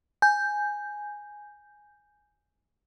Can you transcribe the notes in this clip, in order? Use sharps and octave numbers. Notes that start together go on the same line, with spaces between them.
G#5 G6